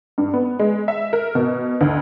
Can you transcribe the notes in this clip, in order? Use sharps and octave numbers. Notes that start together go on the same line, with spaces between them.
G2
B3
G#3
E5
A#4
B2
D2